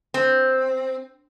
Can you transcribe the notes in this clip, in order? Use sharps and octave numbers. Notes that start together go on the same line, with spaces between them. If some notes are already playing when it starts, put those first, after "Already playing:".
C4